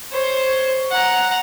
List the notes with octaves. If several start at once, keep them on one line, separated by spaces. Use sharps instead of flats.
C5 C#5
F#5 A#5